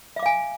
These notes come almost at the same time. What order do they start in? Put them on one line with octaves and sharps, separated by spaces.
E5 D6 F5 G#5